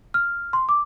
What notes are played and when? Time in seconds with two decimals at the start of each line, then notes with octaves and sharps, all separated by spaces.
0.14 F6
0.53 C6
0.69 D6